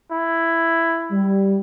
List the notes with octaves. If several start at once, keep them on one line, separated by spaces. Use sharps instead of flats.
E4
G3